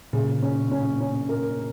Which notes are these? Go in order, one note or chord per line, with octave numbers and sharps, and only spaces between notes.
A#2 C#3
C#4
C#4
C#4
A#4